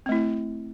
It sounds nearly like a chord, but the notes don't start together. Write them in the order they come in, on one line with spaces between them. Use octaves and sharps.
C4 A3 E4